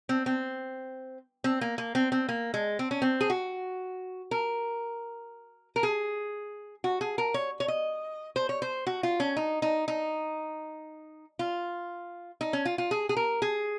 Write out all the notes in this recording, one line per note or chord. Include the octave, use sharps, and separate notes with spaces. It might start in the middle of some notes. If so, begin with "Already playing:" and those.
C4
C4
C4
A#3
A#3
C4
C4
A#3
G#3
C4
C#4
C4
G#4
F#4
A#4
A#4
G#4
F#4
G#4
A#4
C#5
C#5
D#5
C5
C#5
C5
F#4
F4
C#4
D#4
D#4
D#4
F4
D#4
C#4
F4
F4
G#4
G#4
A#4
G#4